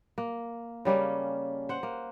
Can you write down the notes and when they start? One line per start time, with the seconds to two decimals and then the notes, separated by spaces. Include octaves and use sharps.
0.18 A#3
0.85 C#3 G3 A#3 C#4
1.69 C5 F#5
1.83 A#3